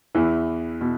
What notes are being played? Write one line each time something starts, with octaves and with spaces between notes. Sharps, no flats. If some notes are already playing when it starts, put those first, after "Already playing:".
E2 E3
B2